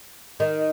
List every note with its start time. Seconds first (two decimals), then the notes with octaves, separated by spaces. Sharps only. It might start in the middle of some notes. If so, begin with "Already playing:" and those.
0.40 D#3